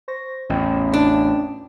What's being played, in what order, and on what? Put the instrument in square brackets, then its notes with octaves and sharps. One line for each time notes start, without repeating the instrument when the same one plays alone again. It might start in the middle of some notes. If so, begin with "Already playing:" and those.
[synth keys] C5 C#6 A#6
[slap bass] A1 E2 [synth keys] C#4 F4 G5
[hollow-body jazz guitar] D4